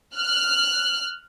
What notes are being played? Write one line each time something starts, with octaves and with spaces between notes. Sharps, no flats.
F6 F#6